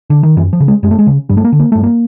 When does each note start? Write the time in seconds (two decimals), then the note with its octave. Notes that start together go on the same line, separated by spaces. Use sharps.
0.10 D3
0.23 D#3
0.37 F#2 E3
0.53 F3
0.60 C#3
0.68 G#3
0.83 F#2 G#3
0.91 A3
0.99 G#3
1.07 C#3
1.29 G2 G3
1.37 A3
1.44 A#3
1.52 D3
1.60 A#3
1.72 G2 A3
1.83 A#3